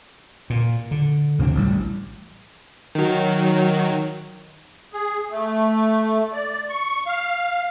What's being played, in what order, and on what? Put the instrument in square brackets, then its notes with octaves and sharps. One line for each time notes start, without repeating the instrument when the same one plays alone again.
[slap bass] A#2
D3
D2 C3 E3 D4
A1 G3
[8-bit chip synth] D#3 F#3
[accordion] G#4
A3
D5
C#6
F5